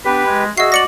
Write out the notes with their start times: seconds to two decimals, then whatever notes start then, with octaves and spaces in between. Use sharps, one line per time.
0.05 B3 D4 G4 B4 B5
0.26 G#3
0.57 F#4 G#4 D#5 E5 C7
0.72 D5 A#6 C#7 F#7